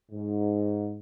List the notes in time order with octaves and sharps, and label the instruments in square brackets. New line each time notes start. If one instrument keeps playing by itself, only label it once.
[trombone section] G#2